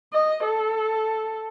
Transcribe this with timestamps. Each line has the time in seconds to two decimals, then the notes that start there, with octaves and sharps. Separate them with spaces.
0.13 D#5
0.45 A4